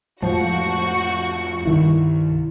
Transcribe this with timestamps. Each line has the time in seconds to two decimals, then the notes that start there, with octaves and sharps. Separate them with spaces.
0.22 F2 A2 F3 G#3 F#4 C#6
1.66 C2 G2 D#3 E4